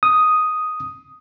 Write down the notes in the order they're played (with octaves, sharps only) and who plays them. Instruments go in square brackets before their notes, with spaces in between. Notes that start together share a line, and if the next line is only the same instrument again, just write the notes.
[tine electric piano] D#6